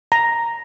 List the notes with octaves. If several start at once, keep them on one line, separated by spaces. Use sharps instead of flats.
A#5